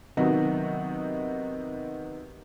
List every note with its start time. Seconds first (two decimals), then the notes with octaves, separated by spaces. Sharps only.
0.17 C3 D#3 F#3 B3 D#4 F#4